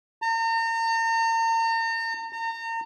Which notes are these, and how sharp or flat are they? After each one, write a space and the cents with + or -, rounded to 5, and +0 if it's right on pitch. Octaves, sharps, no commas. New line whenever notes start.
A#5 -40
A#5 -35